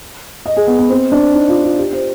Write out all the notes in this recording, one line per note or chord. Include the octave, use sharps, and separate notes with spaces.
D#5
G#4
B3
B3
C4
D4
D#4
F4
F4
G4
C5